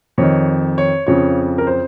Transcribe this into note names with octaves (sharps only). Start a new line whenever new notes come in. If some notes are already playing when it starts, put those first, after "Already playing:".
F2 D#3 C#5
C#5
F2 C#3 F3 C#5
A#4
C5